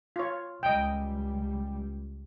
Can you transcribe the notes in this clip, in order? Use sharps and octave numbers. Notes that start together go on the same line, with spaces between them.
F4 C#5
C#2 G3 D#5 G5